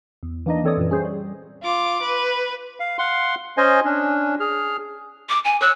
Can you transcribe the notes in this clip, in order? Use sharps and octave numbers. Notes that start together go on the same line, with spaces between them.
E2
E3 A#3 D4 D#4 D#5
E3 C4 A4 C#5 D5 D#6
F#2 A#2 E3
G3 C#4 G#4 C5
G3
F4 D6
B4
F5
F5 F#5 C6
C#4 C5 D#5 G#5
C#4 D4
G#4 F6
D6
G#5
C#5 E6 F#6